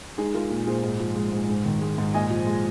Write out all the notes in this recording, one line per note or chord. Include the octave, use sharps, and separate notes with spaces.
G#3 D#4 G#4
G#3 F4 A#4
A#2
A#2 G#4 C5
G#2
F3
G#3
G#2
G#2
D#3
G#3
G#2
A#2 D#5 G#5
F3
G#3